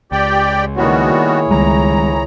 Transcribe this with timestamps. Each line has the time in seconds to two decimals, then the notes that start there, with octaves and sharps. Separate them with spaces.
0.12 C#2 G4 D5 G5
0.77 D#3 G3 A#3 B3 E4 F#4 G#4 C#5
1.51 C#2 D#3 G3 G#3 A#5